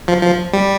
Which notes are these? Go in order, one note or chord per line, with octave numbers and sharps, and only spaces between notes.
F3
F3
G3